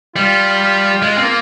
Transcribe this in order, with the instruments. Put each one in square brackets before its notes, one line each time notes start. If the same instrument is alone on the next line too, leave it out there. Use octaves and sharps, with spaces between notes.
[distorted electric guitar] G3 [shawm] F4
[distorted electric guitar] G#3
C4
A#3